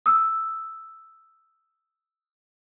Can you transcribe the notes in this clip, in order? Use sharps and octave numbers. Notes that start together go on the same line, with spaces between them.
D#6 E6